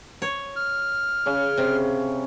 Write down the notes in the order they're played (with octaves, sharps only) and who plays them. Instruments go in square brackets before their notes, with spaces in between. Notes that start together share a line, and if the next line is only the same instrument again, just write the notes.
[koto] C#5
[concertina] F6
[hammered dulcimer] C#3 C#4
[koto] C3